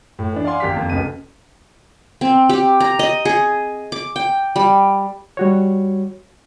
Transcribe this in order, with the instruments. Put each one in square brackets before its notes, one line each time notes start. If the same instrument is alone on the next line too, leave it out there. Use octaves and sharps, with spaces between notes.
[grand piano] A2
E3 D4
D5 F5 F#5 G#5 C6
G#1 A#3 G4 F5 B6
F2 A#3
F1 C#2 F#2 B4 D#7
[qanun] C4
G4
A#5
D#5
G#4
D6
G5
G3
[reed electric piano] G3 F#4 C#5